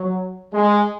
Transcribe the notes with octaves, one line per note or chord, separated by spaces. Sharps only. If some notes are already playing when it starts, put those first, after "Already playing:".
Already playing: F#3
G#3